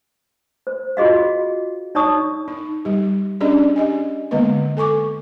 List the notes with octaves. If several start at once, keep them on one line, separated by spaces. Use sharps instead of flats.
C5
F4 F#4 G#4 D#5 F5
D#4 C#5 D5 A5 C#6 D#6
D#4
G3 G4
C#4 D4 G4 G#4 D5 D#5
G4 D#5 G#5
D3 G#3 A#3 B3 B4 D#5
A4 G#5 C#6 D6